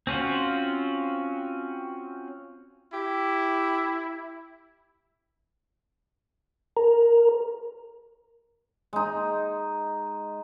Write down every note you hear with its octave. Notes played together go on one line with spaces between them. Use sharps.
C4 C#4 F4 F#4
E4 G4
A#4
G#3 D#4